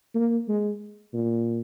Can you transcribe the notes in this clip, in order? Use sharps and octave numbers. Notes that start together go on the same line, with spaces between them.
A#3
G#3
A#2